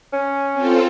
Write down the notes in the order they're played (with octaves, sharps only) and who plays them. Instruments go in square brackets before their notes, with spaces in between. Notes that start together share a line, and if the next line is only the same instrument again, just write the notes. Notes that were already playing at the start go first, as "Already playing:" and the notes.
[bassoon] C#4
[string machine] C4 F4 A4